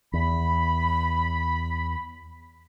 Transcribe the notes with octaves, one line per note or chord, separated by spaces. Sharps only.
E2 B5